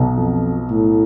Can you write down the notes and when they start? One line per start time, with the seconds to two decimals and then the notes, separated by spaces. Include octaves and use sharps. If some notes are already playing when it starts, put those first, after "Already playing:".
Already playing: B1 B2
0.17 F2
0.70 A2